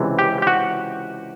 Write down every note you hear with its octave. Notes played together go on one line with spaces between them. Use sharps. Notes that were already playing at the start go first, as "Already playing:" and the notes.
Already playing: C#2 C3 E3
G4
G4
F#4